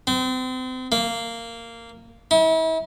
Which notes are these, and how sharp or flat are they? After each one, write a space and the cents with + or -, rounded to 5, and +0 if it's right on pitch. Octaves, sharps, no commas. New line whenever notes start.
C4 -35
A#3 -15
E4 -40